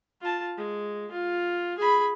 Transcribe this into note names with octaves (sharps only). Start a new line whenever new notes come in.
F4 A5
G#3
F4
G#4 B5